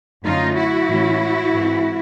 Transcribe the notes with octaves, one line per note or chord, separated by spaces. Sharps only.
F#2 D3 F#3 A3 C#4 D#4 F4
E4 F#4
A2 E3 G#3 C#4
G#2 E3 G#3 C4